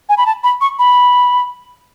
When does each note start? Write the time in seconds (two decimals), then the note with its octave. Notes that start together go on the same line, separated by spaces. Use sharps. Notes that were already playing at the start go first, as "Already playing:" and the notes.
0.09 G#5
0.18 B5
0.26 A5
0.44 B5
0.61 C#6
0.79 B5